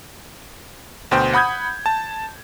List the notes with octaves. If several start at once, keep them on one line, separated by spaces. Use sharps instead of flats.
D2 B2 C5 G5
F#5 B5 D#6 G6 G#6
A5